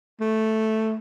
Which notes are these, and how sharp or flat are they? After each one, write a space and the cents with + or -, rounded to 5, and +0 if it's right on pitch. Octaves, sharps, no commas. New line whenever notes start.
A3 +0